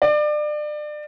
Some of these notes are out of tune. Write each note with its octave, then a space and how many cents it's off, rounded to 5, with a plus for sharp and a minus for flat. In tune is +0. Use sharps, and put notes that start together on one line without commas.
D5 +30